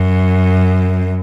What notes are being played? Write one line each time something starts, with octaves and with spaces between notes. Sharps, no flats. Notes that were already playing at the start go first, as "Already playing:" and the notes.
Already playing: F#2